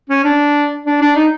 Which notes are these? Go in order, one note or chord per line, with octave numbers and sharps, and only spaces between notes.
C#4
D4
D4
D4
D#4